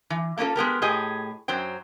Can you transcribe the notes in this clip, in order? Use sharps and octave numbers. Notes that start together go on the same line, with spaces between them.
E3
A3 A#3 C#4 F4 A4
G#3 B3 G4 A#4
A2 G4 G#4 D#5
F#2 F#3 C5 G5